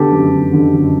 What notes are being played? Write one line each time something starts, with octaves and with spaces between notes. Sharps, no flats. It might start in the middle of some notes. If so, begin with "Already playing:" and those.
Already playing: D3 B3 G4 A4
F#2
D3
D3
F#2